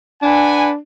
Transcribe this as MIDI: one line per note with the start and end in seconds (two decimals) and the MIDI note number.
0.22 0.77 62
0.22 0.70 71
0.22 0.70 78
0.22 0.70 80